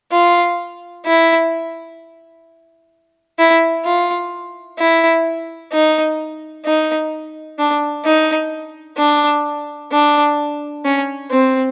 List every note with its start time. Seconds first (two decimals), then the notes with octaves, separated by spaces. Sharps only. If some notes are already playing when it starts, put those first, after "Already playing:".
0.12 F4
1.06 E4
3.39 E4
3.85 F4
4.78 E4
5.72 D#4
6.65 D#4
7.58 D4
8.05 D#4
8.98 D4
9.92 D4
10.85 C#4
11.31 C4